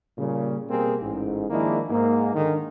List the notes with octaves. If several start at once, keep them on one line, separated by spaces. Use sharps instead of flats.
A#2 C#3 G3
B2 G3 A#3 C4 G#4
A1 G#2
D#3 F3 G#3 A#3 D4 E4
G#2 A#3
D3 D#3 G#3